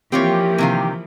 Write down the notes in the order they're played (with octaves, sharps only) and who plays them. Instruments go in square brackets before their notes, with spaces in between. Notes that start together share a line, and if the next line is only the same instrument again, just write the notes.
[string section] E3 F3 A#3 [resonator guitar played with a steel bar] C4 F4 C#5 [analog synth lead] G4
[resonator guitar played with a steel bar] C3 D#3 F5